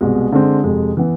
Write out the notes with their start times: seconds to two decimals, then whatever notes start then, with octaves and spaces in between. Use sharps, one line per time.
0.01 C2 B2 G#3
0.32 D3 G#3 C4
0.64 F2 C3 G#3
0.97 E3 B3